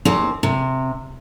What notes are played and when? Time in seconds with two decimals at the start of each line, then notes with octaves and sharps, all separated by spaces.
0.05 D#2 C4
0.43 C3